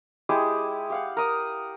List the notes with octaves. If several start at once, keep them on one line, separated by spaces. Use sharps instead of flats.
G#3 E4 G4 G#4
G4 F5 F#5
A#4 D#6